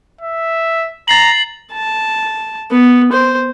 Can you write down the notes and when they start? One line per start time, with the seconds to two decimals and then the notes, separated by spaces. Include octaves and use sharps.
0.21 E5
1.08 A#5 A6 C7 F#7
1.72 A5
2.71 B3
3.12 C5